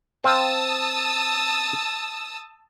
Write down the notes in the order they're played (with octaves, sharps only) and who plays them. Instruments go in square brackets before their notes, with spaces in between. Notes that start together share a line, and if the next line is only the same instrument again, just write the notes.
[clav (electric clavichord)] C4 F5 [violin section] A5 D#6 E6